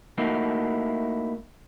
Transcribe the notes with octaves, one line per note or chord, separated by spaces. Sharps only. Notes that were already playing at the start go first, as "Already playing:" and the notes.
A3 A#3 D#4 E4 F#4